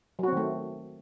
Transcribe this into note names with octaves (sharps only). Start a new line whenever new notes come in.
D#3 F#3 A3 C4 F#4